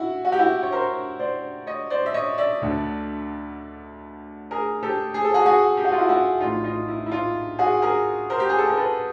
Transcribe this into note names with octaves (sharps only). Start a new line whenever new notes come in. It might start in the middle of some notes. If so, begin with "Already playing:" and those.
Already playing: E4 F#4
F#4
G4
E4 F#4
C#5
A#4 C5
C5 D5
C#5 D#5
C5 D5
E5
C#5 D#5
D5 E5
D2 D3
G#4 A#4
G4 A4
G#4
A4
F#4 G#4
F#4 G#4
G4
F#4
F4
E4 F#4
E4 F#4
A#1 A2 E3 D#4 F4
D#4 F4
E4
E4
D#4 F4
F#4 G#4
G#4 A#4
A#4 C5
G4
G#4
A4
A#4
A4 B4